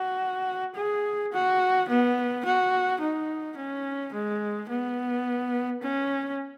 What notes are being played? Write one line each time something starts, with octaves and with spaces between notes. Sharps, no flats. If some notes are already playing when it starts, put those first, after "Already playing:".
Already playing: F#4
G#4
F#4
B3
F#4
D#4
C#4
G#3
B3
C#4